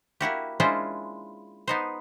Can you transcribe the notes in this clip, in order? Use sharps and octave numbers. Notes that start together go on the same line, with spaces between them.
A#3 E4 F#4 G4
G#3 C#4 D4 E4 F4 C5
B3 D#4 C5